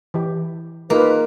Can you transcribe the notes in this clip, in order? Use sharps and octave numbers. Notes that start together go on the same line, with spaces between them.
E3 G4
A#3 D#4 F4 G#4 A#4 B4